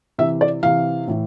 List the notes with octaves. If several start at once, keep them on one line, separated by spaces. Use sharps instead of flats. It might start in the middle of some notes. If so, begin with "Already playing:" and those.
C3 E3 E5
D5
C3 E3 F5
A2 E3